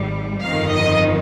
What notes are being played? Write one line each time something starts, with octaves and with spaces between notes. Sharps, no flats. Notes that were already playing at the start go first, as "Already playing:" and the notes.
Already playing: G#1 G#2 G3
G1 F2 D#3 F5
D#5